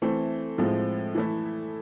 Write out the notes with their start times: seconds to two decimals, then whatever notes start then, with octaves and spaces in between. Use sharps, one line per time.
0.02 E3 A3 C4
0.58 A2 F3 G#3 C4
1.15 E3 A3 E4